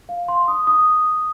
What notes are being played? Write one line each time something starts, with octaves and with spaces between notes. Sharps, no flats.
F5
C6
D#6
D#6